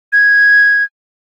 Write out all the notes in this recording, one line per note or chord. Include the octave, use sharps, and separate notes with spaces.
G#6